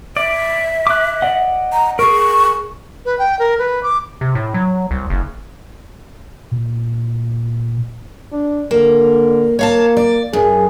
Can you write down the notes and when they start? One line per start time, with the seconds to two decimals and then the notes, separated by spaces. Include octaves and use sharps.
0.17 D5 E5
0.87 D6 F#6
1.22 D5 D#5 F#5
1.72 A#5
1.99 G#4 A#4 C#6
3.05 B4
3.19 G5
3.39 A#4
3.58 B4
3.83 D6
4.21 C3
4.35 A2
4.54 F#3
4.91 C2
5.10 F#1
6.51 A#2
8.33 D4
8.71 D3 A#3
9.59 A#3 C#5 F5 A5
9.97 D5
10.33 F#2 G#4